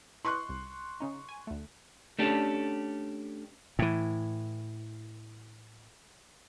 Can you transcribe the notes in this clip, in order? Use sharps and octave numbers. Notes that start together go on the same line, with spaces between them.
E4 B4 D#5 C6 C#6 F#6
C2
C#3 C#4 D#4
G#5
D2 A3
A3 C#4 D4 G4 A4
A2 E3